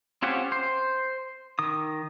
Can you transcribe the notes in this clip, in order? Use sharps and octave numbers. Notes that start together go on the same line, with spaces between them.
C4 C#4 F4 G4 F#5
C5
D#3 D#6